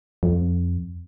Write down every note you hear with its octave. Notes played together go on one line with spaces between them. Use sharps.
F2